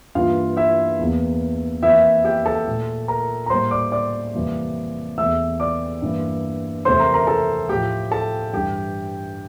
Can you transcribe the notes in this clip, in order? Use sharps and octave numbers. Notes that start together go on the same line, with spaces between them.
G2 E3 A#3 F4 F5
E4 E5
E2 E3 A#3
F2 E3 A#3 E4 E5
G4 G5
A4 A5
A#2 A3
A#4 A#5
A#5
A2 G3 A#3 C5 C6
D5 D6
D5 D6
F2 C3 E3 G3 A#3
E2 E3 A3 E5 E6
D5 D6
G2 E3 A#3
F2 C3 E3 A3 C5 C6
A#4 A#5
A#4 A#5
A4 A5
A2 F3 A3 G4 G5
A4 A5
G2 E3 G3 G4 G5